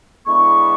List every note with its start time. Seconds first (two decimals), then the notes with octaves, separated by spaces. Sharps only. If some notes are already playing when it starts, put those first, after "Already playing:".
0.26 D3 G#3 B3 E4 C#6